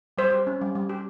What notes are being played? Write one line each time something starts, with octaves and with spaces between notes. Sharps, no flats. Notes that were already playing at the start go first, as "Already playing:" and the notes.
G3 C5
G4
C#4
G3
G3
G4